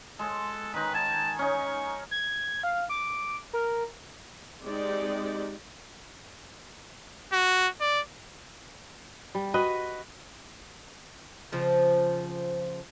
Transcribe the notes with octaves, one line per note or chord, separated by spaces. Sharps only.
G#3 A4
D#3 D#4 B4
G#5 A5
C#4 D#4 C#6
G#6
F5
D6
A#4
G#3 C4 D#4 G4 D5
F#4
D5
G3
F#4 B4 D#5
C#3 F3 C4